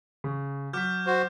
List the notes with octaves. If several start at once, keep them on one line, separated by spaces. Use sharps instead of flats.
C#3
F#3 D6 F6 G6 B6
F#4 C5